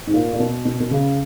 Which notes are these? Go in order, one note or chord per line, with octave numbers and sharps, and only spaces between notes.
G#2
A#2
A#2
B2
B2
B2
C#3